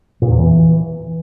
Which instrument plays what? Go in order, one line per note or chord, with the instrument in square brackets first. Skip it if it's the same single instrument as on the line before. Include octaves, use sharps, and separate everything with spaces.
[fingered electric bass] A#2
E2
E3